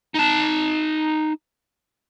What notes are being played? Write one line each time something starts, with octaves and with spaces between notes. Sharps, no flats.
D#4 A5